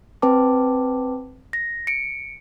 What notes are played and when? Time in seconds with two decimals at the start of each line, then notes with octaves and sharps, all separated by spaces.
0.22 C4 B4 G5 A5 D6
1.53 A#6
1.87 C#7 D7